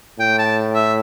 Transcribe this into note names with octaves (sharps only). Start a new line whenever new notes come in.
A2 G5
A5
E5